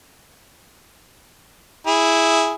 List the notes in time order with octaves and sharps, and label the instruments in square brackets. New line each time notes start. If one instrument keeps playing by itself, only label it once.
[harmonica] E4 G#4